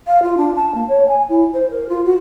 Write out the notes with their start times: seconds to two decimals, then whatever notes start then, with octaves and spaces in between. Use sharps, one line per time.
0.07 F5
0.22 F4
0.37 D4
0.55 A5
0.74 A#3
0.88 C#5
1.08 G#5
1.29 E4
1.53 C5
1.70 A#4
1.89 F4
2.05 F#4